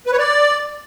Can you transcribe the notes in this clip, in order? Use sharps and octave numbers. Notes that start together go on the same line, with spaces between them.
B4
C#5
D5